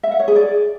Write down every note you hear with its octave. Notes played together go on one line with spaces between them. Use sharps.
E5
F#5
C#5
G#4
D5